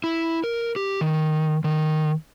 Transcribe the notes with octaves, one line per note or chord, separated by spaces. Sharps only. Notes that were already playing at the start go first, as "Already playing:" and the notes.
E4
A#4
G4
D#3
D#3